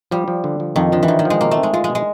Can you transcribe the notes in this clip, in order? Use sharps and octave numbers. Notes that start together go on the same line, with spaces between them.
F3 G3
F3
D3
F3
F2 D#3
D3 F3
E3
D#3 F3
D#3
F3
G#3
B2 A#3
A3
C4
G#3
G#3 F4
G#3
B2
G#3